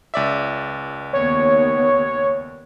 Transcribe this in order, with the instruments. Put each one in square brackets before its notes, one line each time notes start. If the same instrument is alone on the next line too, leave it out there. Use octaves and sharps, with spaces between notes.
[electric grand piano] C#2 D5 E5
[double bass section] D#2 B3 [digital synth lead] C#5